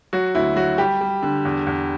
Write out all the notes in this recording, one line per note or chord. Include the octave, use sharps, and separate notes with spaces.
F#3 F#4
D2 E4
F#3 F#4
G3 G4
G3
D3
E2
E2